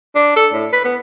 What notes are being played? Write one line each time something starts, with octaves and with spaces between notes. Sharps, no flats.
D4
A4
A2
B4
B3